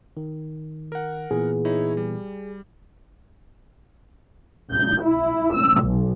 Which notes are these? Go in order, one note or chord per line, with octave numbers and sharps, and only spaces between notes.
D#3
A#4 F#5
A#2 E3 B3 G#4
D#4 E4 C#5
G3
G6
E4
E6
B1